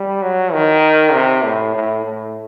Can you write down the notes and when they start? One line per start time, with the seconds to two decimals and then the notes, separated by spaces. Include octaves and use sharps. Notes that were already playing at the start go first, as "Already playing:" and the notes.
Already playing: G3
0.22 F#3
0.53 D#3
1.13 C3
1.45 A2
1.75 A2
2.05 A2